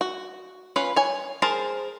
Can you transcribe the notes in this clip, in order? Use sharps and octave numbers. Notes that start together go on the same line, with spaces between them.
F#4
C#4 F4 B4
C#5 G#5
G#4 A#4 C5 A5